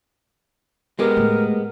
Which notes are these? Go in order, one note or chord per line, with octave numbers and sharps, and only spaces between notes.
G#3 B3 G4 A#4
A2 A3